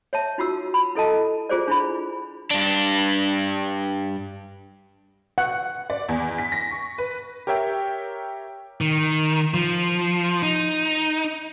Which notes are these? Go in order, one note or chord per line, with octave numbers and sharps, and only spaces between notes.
C#5 E5 A5
D#4 F4 F#4 E6
B5
E4 A4 D#5 A5
F4 G#4 C5 D5
D4 E4 B5
G2 D4
F#5
D5
E2
B6
A#6
C#6
B4
G4 A#4 C#5 E5 G5
D#3
F3
D#4